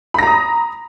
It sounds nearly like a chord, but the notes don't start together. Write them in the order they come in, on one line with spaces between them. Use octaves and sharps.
B5 A#6 A#5 D#6